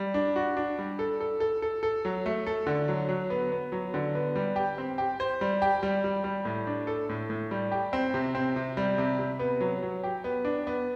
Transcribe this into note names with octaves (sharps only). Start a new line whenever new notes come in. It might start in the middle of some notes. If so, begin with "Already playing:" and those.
Already playing: G3
D4
F#4
D4
G3
A4
A4
A4
A4
A4
F#3
A3
A4
D3
F#3
F#3
B3
B3
F#3
D3
B3
G3
G4
C4
G4
C5
G3
G4
G3
G3
G3
A2
D4
A4
A2
A2
G3
G4
C4
C3
C4
C3
G3
C3
C3
B3
F#3
F#3
G4
B3
D4
B3